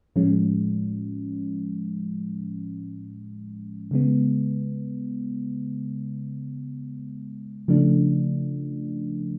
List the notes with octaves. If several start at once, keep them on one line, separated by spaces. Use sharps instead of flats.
A2 F3 G#3 C#4
C#3 G#3 B3
C#3 F3 A3 D4